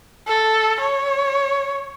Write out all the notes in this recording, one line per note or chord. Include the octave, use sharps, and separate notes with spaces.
A4
C#5